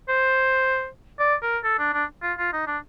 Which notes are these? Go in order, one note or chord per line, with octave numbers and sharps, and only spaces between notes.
C5
D5
A#4
A4
D4
D4
F4
F4
D#4
D4